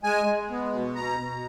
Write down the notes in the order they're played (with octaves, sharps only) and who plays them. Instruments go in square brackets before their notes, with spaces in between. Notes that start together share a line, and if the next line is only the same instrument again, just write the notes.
[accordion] G#3 G#5
G#3
B3
B2
B2 A#5
B2